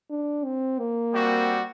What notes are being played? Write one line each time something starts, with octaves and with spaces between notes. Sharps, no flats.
D4
C4
A#3
G3 C4 F#4